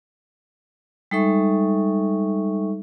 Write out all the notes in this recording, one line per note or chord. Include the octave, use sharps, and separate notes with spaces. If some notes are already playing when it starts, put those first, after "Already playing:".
G3 G#3 D#4 A4 E5 C#6